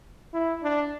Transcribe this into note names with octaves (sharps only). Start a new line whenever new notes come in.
E4
D4